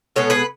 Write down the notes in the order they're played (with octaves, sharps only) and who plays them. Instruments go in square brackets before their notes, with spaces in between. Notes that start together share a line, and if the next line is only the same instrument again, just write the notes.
[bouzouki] B2 G#3 B3 A4 C#5
G#4 B4